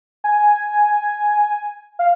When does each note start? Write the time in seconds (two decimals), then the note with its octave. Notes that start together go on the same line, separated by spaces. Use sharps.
0.24 G#5
1.99 F5